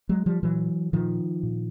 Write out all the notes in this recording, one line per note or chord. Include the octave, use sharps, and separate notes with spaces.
F#3 G#3
F3 G3
A#2 E3 F#3
A#2 D#3 F3
A#2